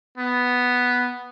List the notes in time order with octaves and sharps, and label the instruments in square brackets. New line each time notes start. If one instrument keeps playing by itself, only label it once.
[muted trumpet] B3